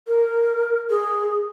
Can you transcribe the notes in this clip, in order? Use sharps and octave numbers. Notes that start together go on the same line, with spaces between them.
A#4
G#4